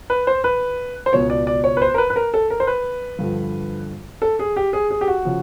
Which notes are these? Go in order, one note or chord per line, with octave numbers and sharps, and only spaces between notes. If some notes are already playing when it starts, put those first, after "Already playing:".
B4
C5
B4
C5
C#2 B2 C#5
D5
D5
C#5
B4
C5
A#4
B4
B4
A#4
A4
A#4
C5
B4
G2 D3 F3
A4
G#4
G4
G#4
G#4
G4
F#4
C#3 F3